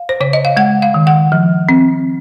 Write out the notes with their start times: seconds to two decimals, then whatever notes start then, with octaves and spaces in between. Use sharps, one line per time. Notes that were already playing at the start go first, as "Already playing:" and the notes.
Already playing: F5
0.09 C5
0.20 C#3 C#5
0.33 D#5
0.45 F5
0.57 G#3 F#5
0.82 F5
0.94 D#3
1.07 F#5
1.32 F3
1.69 C4